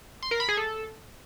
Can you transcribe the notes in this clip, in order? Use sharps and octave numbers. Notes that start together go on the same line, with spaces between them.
C6
A#4
B5
G#4
A4